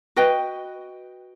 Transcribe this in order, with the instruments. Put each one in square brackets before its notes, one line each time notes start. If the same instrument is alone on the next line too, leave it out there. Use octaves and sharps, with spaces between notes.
[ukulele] F#4 B4 D#5 G5